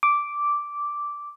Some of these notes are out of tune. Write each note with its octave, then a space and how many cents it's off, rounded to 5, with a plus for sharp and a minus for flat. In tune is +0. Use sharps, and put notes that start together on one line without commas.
D6 -5